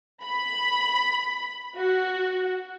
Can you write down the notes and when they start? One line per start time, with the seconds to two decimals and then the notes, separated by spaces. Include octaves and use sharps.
0.24 B5
1.77 F#4